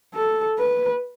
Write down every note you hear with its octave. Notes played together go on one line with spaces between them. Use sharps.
A4
B4